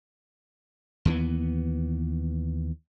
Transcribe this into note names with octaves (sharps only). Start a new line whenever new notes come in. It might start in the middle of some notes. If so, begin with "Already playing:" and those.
D#2 E3 B3